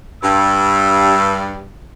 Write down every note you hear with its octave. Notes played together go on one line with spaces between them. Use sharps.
G2 E6